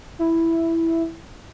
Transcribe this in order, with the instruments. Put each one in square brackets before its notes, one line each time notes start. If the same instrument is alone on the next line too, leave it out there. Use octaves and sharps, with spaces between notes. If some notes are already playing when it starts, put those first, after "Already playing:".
[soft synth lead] E4